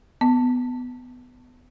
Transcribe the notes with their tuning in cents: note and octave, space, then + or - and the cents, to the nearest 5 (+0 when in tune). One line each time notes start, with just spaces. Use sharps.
B3 +10